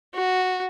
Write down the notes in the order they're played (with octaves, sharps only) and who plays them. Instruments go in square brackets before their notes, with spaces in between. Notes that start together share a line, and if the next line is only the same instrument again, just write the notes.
[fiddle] F#4